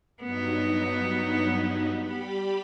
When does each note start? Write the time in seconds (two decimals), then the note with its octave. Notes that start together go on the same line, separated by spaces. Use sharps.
0.23 G2 F#3 B3 D#4
1.99 G3 G4 B5